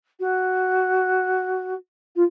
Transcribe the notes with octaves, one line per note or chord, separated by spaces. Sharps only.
F#4
F4